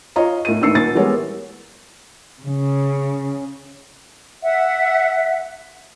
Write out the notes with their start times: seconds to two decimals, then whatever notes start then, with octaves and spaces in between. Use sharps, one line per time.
0.16 F4 C#5 D#5 A#5
0.45 A2 A#4 D#7
0.61 A1 D#2 D4 E6 C7 C#7
0.74 D#1 A6
0.95 E3 G3 G#3 B3 A#4 C#5
2.42 C#3
4.42 E5 F#5